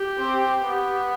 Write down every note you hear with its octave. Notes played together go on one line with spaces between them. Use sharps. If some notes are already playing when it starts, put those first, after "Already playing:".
Already playing: G4
C4
B3